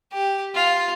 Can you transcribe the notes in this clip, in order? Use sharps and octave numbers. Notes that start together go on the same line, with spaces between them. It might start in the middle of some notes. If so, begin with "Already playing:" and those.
G4
F4